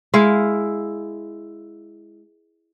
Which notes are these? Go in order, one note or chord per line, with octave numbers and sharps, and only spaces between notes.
G#3 E4 F5